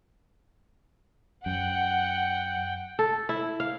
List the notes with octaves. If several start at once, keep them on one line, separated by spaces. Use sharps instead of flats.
F#2 F#5 G5
A4
E4
F5